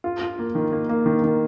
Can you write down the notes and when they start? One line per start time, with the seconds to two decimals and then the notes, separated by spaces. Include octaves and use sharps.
0.04 F4
0.21 F4
0.39 A#3
0.55 D#3
0.72 A#3
0.89 A#3
1.06 D#3
1.24 D#3